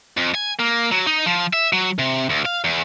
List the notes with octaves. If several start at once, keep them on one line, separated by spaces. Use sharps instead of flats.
F2
G#5
A#3
F#3
D#4
F3
E5
F#3
C3
D2
F5
E2